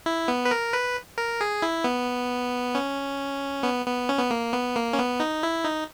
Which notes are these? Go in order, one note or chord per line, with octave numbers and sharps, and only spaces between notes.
E4
B3
B4
A#4
B4
A#4
G#4
E4
B3
C#4
B3
B3
C#4
B3
A#3
B3
A#3
C#4
B3
D#4
E4
D#4